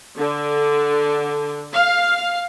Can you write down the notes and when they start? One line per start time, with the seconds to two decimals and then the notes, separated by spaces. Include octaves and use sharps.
0.16 D3
1.73 F5